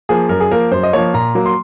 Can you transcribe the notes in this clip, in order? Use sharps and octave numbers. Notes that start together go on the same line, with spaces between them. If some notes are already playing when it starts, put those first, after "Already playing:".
F3 A#3 G#4
F#2 A#4
G#4
F3 A#3 A#4
F#2 C5
D#5
F3 A#3 C#5
A#2 A#5
F#3 A#3
C6